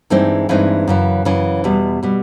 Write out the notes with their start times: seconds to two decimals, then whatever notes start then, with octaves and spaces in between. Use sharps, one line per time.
0.10 G2 E3 G#3 C4 D#4
0.49 G2 E3 G#3 C4 D#4
0.87 F#2 C#3 E3
1.25 F#2 C#3 E3
1.64 E2 B2 G3
2.03 B2 G3